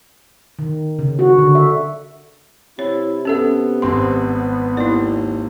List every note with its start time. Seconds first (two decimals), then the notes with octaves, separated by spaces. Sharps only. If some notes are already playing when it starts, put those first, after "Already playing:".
0.59 D#3
0.99 C#3
1.19 F#4
1.38 D3
1.55 E5
2.79 C3 E4 C#5
3.25 B3 C#4 A4 E5
3.82 G#1 C4 B5 C6
4.77 D#2 E4 D5